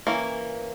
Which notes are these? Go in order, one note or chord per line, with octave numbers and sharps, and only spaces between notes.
E3 A#3 C#4